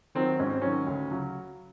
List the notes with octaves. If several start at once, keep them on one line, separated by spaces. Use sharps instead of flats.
D#3 F#3 C4
G#2 C#4
C4
D#3 F#3 C#4
D2
C#3 F#3